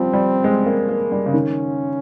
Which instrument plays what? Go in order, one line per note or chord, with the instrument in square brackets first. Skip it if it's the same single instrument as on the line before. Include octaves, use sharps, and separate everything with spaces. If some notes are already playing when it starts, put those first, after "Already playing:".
Already playing: [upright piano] F3 G3 [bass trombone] C4
[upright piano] G3
G#3
A#3
A#3
G3
C#3
[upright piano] D#3 [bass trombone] C#4